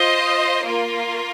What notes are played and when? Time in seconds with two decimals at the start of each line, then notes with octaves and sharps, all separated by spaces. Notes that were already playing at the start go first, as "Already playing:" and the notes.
Already playing: F4 C5 D#5
0.64 A#3 F4 A#4